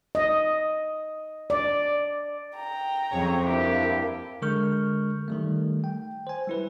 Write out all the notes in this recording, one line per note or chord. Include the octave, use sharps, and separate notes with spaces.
D#5
D5
G5 A#5
F2 C#3 C#5
G2 A#3 D4 E4 G4
D3 G#3 A#4 C#6 F6 G6
D#3 G3 A3
G5
C5 G#5
G3 E4 B4